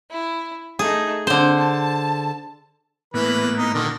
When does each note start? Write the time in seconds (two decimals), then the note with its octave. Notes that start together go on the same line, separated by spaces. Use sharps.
0.11 E4
0.79 A3 D#4 G#4
1.27 D3 C4 C5
1.59 A5
3.14 A2 E3 A#3 B3 B4
3.58 D#4
3.74 A#2 D3 D#3 D4 A#4